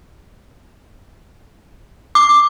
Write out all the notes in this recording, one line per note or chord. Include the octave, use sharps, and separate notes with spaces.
D6